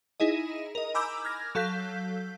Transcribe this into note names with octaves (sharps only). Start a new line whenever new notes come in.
D#4 E4 G#4 D#5
A#4 D#5
G#5 A#5 B5 D6 E6 G6
F6 G#6 A#6
F#3 A4 F5 G6 B6